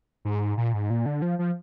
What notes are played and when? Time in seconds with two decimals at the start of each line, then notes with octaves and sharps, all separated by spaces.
0.25 G#2
0.57 A#2
0.74 G#2
0.90 A#2
1.06 D3
1.22 F3
1.39 F3